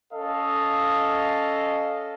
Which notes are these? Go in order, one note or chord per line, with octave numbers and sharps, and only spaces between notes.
C#4 A4 D#5 F5